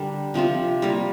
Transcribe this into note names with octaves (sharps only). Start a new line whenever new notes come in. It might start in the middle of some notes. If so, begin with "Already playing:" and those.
Already playing: D3 G3 D4 A#4
C3 F3 C4 F4
G3 A#3 F4 A#4